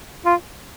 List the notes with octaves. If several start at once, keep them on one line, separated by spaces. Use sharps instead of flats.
F4